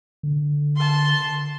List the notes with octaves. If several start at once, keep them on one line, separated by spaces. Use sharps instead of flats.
D3
A5 C6